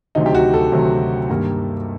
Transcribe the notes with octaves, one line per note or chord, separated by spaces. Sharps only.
D2 C3 D#3 F#3 D#4
G4
F#4
A4
D2 C3 D#3 F#3
G2 D#3 G3 A#3